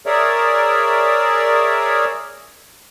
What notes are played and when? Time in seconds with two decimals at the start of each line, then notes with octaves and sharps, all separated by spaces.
0.06 G#4 A#4 C#5 D5 E5